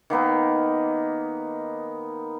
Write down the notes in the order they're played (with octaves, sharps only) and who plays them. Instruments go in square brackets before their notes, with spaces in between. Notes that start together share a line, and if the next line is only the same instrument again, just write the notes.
[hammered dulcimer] D#3 A#3 B3 D#4